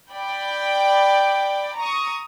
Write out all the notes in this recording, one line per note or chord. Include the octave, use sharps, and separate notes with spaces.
D5 G5 B5
A#5 C#6 D#6